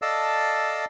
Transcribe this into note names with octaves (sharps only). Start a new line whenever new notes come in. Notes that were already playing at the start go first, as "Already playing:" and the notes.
A4 D5 D#5 F5 A5 E6